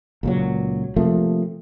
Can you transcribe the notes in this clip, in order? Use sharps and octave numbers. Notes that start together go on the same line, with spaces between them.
C#2 A#2 F#3
C3 F3 A3 A#3